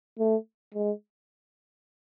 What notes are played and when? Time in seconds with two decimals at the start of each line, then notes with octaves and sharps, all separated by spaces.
0.19 A3
0.74 G#3